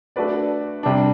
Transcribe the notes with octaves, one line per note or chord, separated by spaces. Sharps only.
A3 D4 F#4 B4 D5
C3 G3 D4